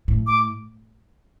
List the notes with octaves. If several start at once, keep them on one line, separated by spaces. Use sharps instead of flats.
A2
D6